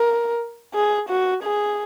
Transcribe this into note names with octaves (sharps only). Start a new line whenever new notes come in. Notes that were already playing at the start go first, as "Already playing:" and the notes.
Already playing: A#4
G#4
F#4
G#4